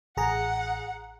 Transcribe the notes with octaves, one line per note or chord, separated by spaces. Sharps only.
A1 G#4 F#5 A#5